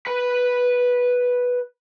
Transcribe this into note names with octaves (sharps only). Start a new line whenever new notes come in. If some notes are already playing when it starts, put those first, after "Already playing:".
B4 B5